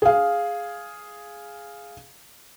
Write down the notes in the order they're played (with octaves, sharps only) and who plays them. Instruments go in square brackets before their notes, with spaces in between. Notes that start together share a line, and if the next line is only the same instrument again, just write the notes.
[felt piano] G#4 F5